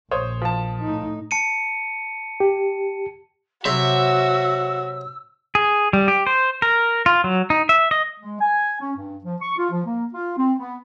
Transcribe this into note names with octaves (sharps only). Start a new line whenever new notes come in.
A#1 C5 C#5 D#6
F3 A5
A2 D#4
A5 C#7 D#7
G4
C3 F#3 F#4 E5 E6
G#4
G3
G4
C5
A#4
F4
F#3
D#4
E5
D#5
G#3
G#5
C#4
G2
F3
C#6
F4
F3
A#3
F4
C4
B3